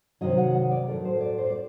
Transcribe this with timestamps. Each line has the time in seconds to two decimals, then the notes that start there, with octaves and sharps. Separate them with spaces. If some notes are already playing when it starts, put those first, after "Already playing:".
0.21 C3 D#3 F#3 D#5
0.38 F#5
0.55 D#5
0.71 D5
0.87 A2 F#3 A3 D#4 A#4
1.05 C5
1.21 D5
1.38 C5
1.50 D5